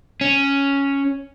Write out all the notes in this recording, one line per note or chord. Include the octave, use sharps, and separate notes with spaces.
C#4